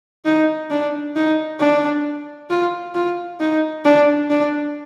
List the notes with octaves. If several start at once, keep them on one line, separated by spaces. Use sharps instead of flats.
D#4
D4
D#4
D4
F4
F4
D#4
D4
D4